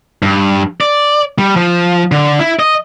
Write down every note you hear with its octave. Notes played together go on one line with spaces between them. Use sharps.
G2
D5
G3
F3
D3
E4
D#5